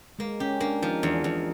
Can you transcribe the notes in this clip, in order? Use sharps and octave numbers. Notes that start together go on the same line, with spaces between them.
G#3 A#3
C#4 G4
A#3 D4
F3 D#4
E2 D4
E2